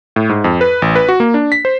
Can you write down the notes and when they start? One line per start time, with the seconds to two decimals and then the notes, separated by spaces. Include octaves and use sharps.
0.16 A2
0.29 G#2
0.44 F2
0.61 B4
0.82 A1
0.95 B4
1.09 F#4
1.20 A#3
1.34 D4
1.52 B6
1.65 C5